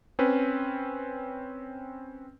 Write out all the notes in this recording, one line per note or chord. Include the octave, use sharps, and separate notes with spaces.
C4 C#4 B4